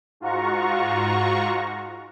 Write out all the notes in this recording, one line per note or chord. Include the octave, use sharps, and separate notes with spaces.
G#2 F4 F#4 A#5 C#6